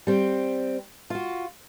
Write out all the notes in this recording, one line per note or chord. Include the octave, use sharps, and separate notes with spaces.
G3 C4
F4 F#4